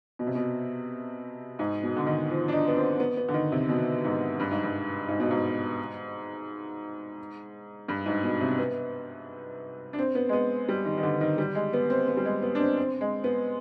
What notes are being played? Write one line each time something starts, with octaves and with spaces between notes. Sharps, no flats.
B2
C3
B2
G#2
B2
D3
D#3
F3
D4
D#4
B3
C4
B3
B3
D3
D#3
C3
B2
G#2
G2
G#2
G2
G#2
B2
G#2
G2
G#2
B2
C3
B3
D4
C4
B3
G#3
B3
G3
D#3
D#3
D3
D#3
G3
G#3
B3
C4
B3
G3
G#3
B3
D4
C4
C4
G#3
B3